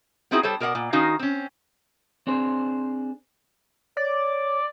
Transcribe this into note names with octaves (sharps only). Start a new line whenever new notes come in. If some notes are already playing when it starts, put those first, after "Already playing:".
B3 C4 D#4 E4 F#4 G#4
G3 A4 C5 C#5
B2 A#4 D5 E5 F#5
A#2
D#3 C#4 D#4 F#4 F5
C4 C#4
C4 D4 G#4 C5
C#5 D5